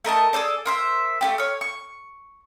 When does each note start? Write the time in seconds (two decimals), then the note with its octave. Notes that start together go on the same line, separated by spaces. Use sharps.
0.05 A3 A#4 D#5 A5
0.33 G#4 A4 C5 D5
0.65 A#4 C5 E5
1.21 A3 E4 G4
1.38 C#5 F6
1.61 C#6